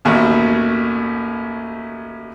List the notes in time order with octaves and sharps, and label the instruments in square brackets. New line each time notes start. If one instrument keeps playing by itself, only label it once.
[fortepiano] A1 D#2 B2